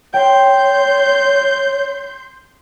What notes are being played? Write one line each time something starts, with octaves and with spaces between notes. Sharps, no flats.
C#5 G5 C6 G6